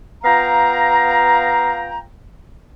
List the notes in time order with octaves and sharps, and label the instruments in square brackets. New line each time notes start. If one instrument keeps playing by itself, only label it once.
[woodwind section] B3 F4 F5 G5 A#5